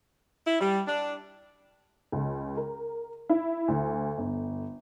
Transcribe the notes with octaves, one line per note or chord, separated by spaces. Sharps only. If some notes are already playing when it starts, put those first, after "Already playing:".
E4
G3
D4
C#2
A#4
E4
D2
G1